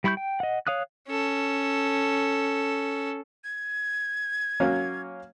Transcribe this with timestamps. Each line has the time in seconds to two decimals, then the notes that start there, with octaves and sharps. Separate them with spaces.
0.04 G3 E4 B5 C#6 G6
0.17 G5
0.40 D#5 F#5
0.67 C#5 F5 D#6 F#6
1.08 C#4 A4
3.44 G#6
4.60 F#3 A#3 C#4